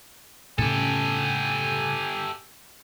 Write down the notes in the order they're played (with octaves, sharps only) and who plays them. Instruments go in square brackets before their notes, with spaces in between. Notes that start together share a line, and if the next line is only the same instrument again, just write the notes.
[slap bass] A2 C#3 C#4 [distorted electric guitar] G4 A4 [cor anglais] G#5